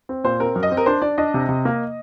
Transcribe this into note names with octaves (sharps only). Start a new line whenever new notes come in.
C4
A#2 C5
C4 A#4
F#2
D#5
C4
A#4
D4 C5
D4 D5
D4 D#5
C3
C3
A#3